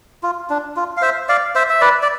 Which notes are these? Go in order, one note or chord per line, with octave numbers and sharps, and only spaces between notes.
F4
D4
F4
F5
C5 E5
D5 F5
C5 E5
E5
B4 D5
D5